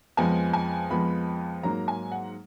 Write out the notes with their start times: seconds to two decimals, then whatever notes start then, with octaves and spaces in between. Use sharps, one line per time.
0.17 F2 F3 G#3 B3 G#5
0.53 G#5
0.90 F2 F3 G#3 B3 B5
1.63 G#2 F#3 A#3 A#5
1.88 G#5
2.12 F#5